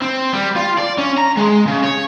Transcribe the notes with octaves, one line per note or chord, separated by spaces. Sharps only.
C4
G3
F4
D5
C#4
A#5
G#3
C#3
C#5